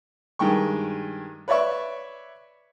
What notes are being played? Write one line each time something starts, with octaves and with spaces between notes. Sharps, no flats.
G2 D#3 G#3 G5 C#6
B4 C#5 D5 E5 C#6